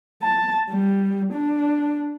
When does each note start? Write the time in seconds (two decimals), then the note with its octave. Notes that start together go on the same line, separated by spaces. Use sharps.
0.23 A5
0.70 G3
1.33 D4